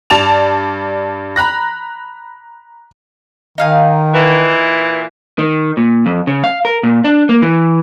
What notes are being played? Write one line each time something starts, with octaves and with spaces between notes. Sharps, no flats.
G2 D5 A5 E7 F7
A#5 B5 F#6 A#6
D#3 D#4 F5 G#5
A#2 E3
D#3
A#2
F2
C#3
F5
A#4
A#2
D4
A#3
E3